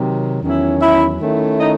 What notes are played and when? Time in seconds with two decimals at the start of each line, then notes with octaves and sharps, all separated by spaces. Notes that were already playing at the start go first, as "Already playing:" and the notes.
Already playing: C3 D#3 F#3
0.41 E2 D#3 F#3 C#4 E4
0.80 E4 E5
1.20 D#3 A3 C#4 E4
1.60 D#4 D#5